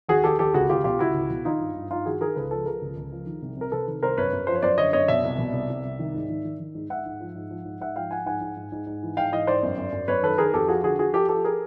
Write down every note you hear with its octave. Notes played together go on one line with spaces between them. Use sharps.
D#2 F#4 G#4
D#2 G4 A4
D#2 G4 A4
C#2 F#4 G#4
C#2 F4 G4
B2 F4 G4
C#2 E4 F#4
C#2
B2
D#3 D#4 F4
G2
G2
G2 D#4 F4
D#3 F#4 G#4
D#3 G#4 A#4
C#2 A4 B4
F3 A4 B4
F3 G#4 A#4
C#2
C#2
F3
D#3
C2
C3 A#4
C3 A4 B4
D#3
C2 A#4 C5
F#2 B4 C#5
F#2
F3 C5
C#5
F#2 C5 D5
D3 C#5 D#5
F#2 C#5 D#5
B2 D5 E5
C2
B2
C2
C2
C2
D#3
G#2
D#3
D#3
D#3
G#2
G#2 E5 F#5
G#2
F3
G#2
F3
G#2
G#2 E5 F#5
F3 F5 G5
F3 F#5 G#5
G#2 F#5 G#5
G#2
G#2
G#2
G#2
E3
G#2 F5 G5
E3 D#5 F5
G#2 C5 D5
F#2
F#2
F#2
F#2 B4 C#5
D#3 A4 B4
D#3 G#4 A#4
F2 G4 A4
F3 F#4 G#4
D3 F#4 G#4
F3 F#4 G#4
F3 G4 A4
F3 G4 A4
G#4 A#4